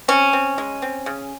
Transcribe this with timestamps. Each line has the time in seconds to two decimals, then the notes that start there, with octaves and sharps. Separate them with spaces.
0.08 C4 C#4
0.33 C4
0.58 G#3
0.82 C4
1.06 C#3